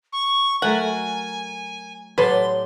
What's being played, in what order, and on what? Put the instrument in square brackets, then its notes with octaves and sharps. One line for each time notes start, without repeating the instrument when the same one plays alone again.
[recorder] C#6
[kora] F#3 A3 A#4 [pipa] F#5 [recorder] G#5
[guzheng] A2 F#3 A5 [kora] G4 D5 [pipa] B4 [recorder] C6